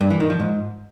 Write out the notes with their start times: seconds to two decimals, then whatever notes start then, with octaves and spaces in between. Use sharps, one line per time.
0.01 G2
0.10 E3
0.20 D#3
0.30 F3
0.40 G#2